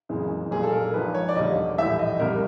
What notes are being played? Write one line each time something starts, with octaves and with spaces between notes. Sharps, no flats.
F#1 F2 C#3 E3 G#3
B1 A#2 G3 G#4
A4
A#4
A#1 G#2 F3 B4
C#5
D5
E1 D#2 D3 G3 D#5
A#1 A2 E3 G3 E5
D#5
C2 C3 D#3 G3 A#4